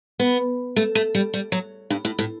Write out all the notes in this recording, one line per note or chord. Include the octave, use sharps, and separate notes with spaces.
B3
A3
A3
G3
G3
F#3
G2
A2
A2